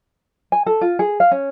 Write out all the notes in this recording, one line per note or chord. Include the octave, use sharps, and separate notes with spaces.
G#5
A4
F4
G#4
F5
C#4